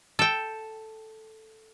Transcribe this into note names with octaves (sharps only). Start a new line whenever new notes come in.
A4 G5